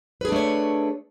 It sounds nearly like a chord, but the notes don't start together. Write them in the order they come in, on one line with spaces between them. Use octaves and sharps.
B4 G#4 D4 A3 C#5